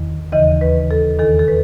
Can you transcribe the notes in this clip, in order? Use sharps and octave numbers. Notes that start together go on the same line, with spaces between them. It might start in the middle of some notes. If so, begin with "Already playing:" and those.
Already playing: E2 D#3
D#2 C#3 E3 D#5
B4
A4
E2 D#3 A4
A4
B4